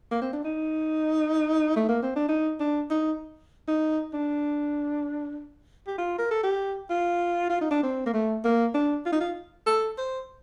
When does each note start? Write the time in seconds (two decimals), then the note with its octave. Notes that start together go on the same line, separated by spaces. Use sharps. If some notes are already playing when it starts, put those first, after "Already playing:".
0.11 A#3
0.22 C4
0.33 D4
0.45 D#4
1.76 A3
1.89 A#3
2.03 C4
2.16 D4
2.29 D#4
2.60 D4
2.91 D#4
3.68 D#4
4.14 D4
5.87 G4
5.98 F4
6.18 A#4
6.31 A4
6.43 G4
6.90 F4
7.50 F4
7.61 D#4
7.71 D4
7.83 C4
8.06 A#3
8.14 A3
8.45 A#3
8.74 D4
9.06 F4
9.12 D#4
9.21 F4
9.67 A4
9.98 C5